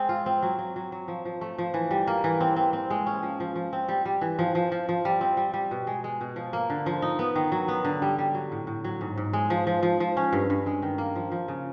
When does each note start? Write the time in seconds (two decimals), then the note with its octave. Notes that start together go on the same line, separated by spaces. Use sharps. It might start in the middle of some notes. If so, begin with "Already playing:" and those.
Already playing: G#3 C4
0.09 F4
0.26 C4
0.42 F#3
0.59 F#3
0.76 F#3
0.92 F#3
1.08 F3
1.25 F3
1.41 A3
1.58 F3
1.74 E3
1.91 G3
2.07 A#3
2.24 E3
2.40 C4
2.56 C4
2.73 C4
2.90 G#3
3.07 C#4
3.23 F3
3.40 F3
3.55 F3
3.73 C4
3.89 G3
4.05 G3
4.21 E3
4.39 F3
4.55 F3
4.72 F3
4.89 F3
5.05 G3
5.21 C4
5.37 G3
5.54 G3
5.71 B2
5.87 G#3
6.04 G#3
6.21 B2
6.36 F3
6.53 A#3
6.70 D3
6.86 F3
7.02 D#4
7.19 B3
7.36 D#3
7.52 F#3
7.68 B3
7.85 D3
8.02 G3
8.18 G3
8.35 F#3
8.52 A2
8.67 A2
8.84 F#3
9.01 G#2
9.18 G#2
9.33 G#3
9.50 F3
9.67 F3
9.83 F3
10.00 F3
10.17 C#4
10.33 G2
10.50 G2
10.66 G#3
10.82 D#3
10.98 A#3
11.16 F3
11.32 F3
11.48 C#3